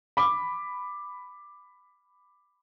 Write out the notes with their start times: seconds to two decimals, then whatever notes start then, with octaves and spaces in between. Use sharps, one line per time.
0.17 B5 D6